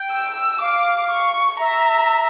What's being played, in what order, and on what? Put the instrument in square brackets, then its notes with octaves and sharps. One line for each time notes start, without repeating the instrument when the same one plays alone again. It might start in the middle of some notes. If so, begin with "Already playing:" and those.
Already playing: [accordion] G5
[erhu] E6
[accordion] F5 [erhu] D6
[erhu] C#6
[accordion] E5 [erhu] A#5